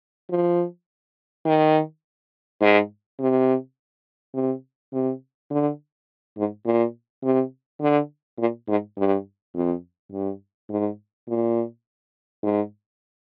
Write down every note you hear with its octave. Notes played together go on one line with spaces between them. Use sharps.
F3
D#3
G#2
C3
C3
C3
D3
G#2
A#2
C3
D3
A#2
G#2
G2
F2
G2
G#2
A#2
G#2